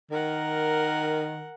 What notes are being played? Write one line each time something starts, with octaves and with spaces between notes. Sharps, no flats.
D#3 A#4 F#5